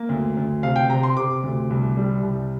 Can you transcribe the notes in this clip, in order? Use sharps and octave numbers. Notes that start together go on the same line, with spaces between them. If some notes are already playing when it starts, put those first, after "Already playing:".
Already playing: A#3
D2
D2
C3 F5
G5
C3 A#5
C6
C3 D6
D2
C2
G3
C2